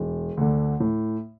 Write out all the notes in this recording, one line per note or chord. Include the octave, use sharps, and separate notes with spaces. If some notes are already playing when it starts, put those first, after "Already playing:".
Already playing: E1
D2 D3
A2